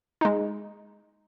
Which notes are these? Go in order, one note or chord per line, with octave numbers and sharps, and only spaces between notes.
G#3 D#4